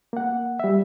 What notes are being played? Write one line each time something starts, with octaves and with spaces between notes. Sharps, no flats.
A#3 F#5
G3 E5